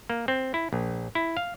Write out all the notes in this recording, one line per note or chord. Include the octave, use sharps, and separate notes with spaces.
A#3
C4
E4
A#1
E4
F5